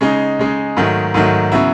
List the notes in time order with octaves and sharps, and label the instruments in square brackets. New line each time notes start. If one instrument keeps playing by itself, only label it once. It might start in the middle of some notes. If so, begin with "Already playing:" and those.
[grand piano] C#3 G#3 D#4
C#3 G#3 D#4
G#2 D#3 F#3 A3
G#2 D#3 F#3 A3
C#3 F#3 B3 E4